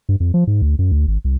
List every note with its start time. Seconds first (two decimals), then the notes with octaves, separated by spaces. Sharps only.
0.09 G2
0.20 F2
0.34 F3
0.47 G#2
0.62 D2
0.79 F#2
0.92 D2
1.08 G#1
1.24 C2